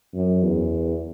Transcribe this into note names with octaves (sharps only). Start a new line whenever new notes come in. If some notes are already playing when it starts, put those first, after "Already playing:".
F#2
E2